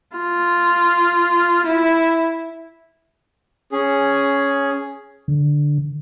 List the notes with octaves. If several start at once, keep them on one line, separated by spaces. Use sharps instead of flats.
F4
E4
C#4 G#4
D3